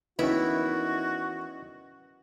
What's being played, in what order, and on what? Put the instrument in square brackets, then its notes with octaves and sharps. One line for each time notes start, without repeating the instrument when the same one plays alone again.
[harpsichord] E2 D#3 [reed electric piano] C#4 B4 [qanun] E4 [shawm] F#4